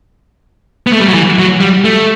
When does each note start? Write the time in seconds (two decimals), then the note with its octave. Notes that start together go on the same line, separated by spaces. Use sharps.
0.87 B3
0.93 A3
1.00 G3
1.08 F#3
1.14 E3
1.39 F#3
1.61 G3
1.85 A3